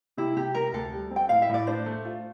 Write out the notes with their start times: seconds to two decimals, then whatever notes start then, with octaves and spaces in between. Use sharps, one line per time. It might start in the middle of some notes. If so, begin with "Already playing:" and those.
0.17 C3 E4
0.36 C3 G4
0.55 C3 A#4
0.73 D2 A4
0.93 G3
1.11 C4
1.16 G5
1.29 A2 F5
1.42 E5
1.49 A2 D5
1.67 D4 C5
1.86 A3
2.05 F4